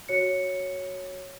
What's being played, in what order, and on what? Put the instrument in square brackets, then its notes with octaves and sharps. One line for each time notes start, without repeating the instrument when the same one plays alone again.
[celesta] F#4 C#5 C#7